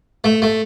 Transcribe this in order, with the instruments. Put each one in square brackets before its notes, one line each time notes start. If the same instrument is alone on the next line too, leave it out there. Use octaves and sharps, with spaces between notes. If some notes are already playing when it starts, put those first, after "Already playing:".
[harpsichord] A3
A3